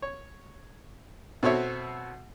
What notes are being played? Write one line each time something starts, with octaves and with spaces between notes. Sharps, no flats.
C#5
B2 C4 F#4 A4 C#5 E5